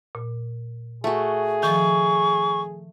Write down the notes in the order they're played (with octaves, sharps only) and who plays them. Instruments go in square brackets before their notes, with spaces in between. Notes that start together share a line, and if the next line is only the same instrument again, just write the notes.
[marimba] A#2
[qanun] A3 F#4 [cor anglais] G#4
[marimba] D#3 F3 [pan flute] C#6